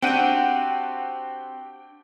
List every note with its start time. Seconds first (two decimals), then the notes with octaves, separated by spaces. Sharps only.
0.02 C4 D4 F#4 G4 F#5 G5 D#7